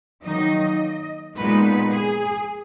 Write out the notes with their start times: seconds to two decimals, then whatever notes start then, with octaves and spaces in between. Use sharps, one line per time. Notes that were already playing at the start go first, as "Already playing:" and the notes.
0.24 D#3 F#3 A#3 D#4 D#5
1.36 A#2 G#3 B3 D#4 B4
1.92 G#4